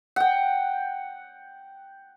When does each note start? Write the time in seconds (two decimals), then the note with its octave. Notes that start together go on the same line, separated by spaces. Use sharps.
0.16 F#5 G5